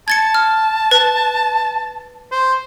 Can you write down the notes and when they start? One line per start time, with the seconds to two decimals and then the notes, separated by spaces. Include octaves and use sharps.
0.08 A5 G#6 A6 C#7
0.35 F6
0.91 B4 A6
2.32 C5